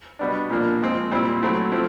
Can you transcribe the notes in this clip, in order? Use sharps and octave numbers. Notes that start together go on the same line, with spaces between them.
B2 G3 B3 D4
A#2 F3 A#3 D4
F3 G#3 C4
A#2 G3 C4 E4
F#3 A3 C4 E4
F3 A3 C4 E4